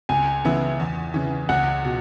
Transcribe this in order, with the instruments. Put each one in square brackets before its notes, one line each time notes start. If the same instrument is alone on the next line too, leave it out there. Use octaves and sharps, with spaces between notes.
[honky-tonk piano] C#2 [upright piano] G#5
[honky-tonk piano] C#3 E3 B3 E4
E2
C#3 E3
[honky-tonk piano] C#2 [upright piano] F#5
[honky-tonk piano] B2